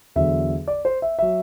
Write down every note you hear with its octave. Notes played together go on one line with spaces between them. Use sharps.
E2 D3 F#3 E5
D5
C5
E5
F#3 E5